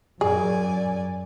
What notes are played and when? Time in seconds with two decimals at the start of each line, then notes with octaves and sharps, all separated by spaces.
0.21 F#2 G#4 D5 G#5